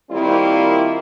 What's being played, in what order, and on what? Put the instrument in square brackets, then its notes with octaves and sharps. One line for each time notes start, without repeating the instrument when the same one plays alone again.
[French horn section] D#3 G3 A#3 C4 E4 F4